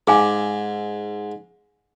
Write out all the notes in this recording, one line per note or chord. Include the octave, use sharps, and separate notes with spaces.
G#2 G#4 F5 G#5